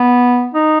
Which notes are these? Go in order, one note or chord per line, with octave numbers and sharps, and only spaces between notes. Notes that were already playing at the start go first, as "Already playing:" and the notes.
Already playing: B3
D#4